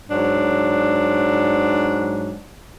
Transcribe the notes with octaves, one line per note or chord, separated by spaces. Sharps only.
G#2 F#3 D4